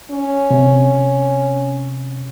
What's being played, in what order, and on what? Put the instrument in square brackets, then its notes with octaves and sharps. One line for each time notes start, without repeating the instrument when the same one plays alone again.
[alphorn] C#4
[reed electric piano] C3